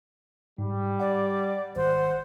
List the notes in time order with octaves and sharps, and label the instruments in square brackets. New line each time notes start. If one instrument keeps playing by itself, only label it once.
[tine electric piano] G#2 [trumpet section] G3
[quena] D5 [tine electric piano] F#5
[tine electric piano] G#1 [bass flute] C5 [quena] F#5